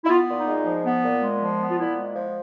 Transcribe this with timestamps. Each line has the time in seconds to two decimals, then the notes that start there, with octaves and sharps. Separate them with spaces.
0.05 E4
0.09 B3 F4
0.28 A#2
0.37 D#4
0.46 G#3
0.65 F3
0.84 B3
1.03 A#2
1.22 G#3
1.40 F3
1.59 B3
1.69 F4
1.77 A#2 E4
1.97 G#3
2.16 F3